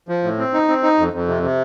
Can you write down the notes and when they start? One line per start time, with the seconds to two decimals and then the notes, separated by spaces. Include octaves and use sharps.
0.09 F3
0.24 A2
0.38 C4
0.54 D#4
0.68 C4
0.83 D#4
0.98 F2
1.13 F2
1.28 C3
1.43 C3